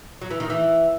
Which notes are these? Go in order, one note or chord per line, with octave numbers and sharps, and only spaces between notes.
F#3
E3
D#3
E3